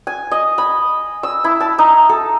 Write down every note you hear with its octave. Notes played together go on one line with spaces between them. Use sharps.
G#5
D#5
B5
E6
E4
A5
D#4
A4